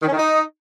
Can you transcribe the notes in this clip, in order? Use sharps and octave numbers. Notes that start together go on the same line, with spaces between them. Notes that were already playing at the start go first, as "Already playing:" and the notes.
D#3
C#4
D#3
D#4